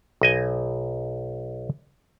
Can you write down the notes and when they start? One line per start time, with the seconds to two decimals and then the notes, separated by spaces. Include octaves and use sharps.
0.21 B1 D#5 G#5